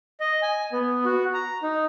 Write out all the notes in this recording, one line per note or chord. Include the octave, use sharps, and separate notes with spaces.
D#5
G#5
B3
F#4
A#5
D#4